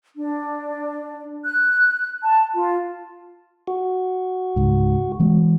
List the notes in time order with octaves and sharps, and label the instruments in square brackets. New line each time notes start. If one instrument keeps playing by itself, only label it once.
[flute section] D4
F#6
A5
F4
[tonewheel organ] F#4
[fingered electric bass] C#2 G#2
E3 G#3 B3